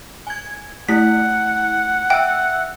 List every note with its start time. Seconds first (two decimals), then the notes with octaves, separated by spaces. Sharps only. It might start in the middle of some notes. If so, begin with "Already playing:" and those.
0.27 G#5 G#6
0.89 A3 E4 F#5 B6
2.10 E5 G5 E6